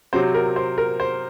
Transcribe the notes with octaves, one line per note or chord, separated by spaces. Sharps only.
C3 F#3 C4 C5
A#4
C5
A#4
C5